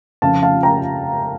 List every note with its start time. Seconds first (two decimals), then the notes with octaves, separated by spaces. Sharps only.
0.22 F2 C#3 F3 C#4 F5 A5
0.43 F5 A5
0.63 G5 A#5